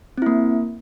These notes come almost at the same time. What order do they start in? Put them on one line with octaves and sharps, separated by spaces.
C4 E4 A#3